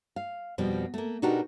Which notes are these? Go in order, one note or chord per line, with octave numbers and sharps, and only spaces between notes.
F5
F2 B2 F3 G3
A3 A#3
B2 D4 D#4 F#4 G4 A#4